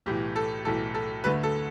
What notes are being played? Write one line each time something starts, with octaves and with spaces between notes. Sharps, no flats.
B1 A2 E3 G4
A4
B1 A2 E3 A4
A4
D2 D3 A3 B4
A4